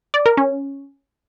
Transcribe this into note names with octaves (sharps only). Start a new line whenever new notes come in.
D5
A#4
C#4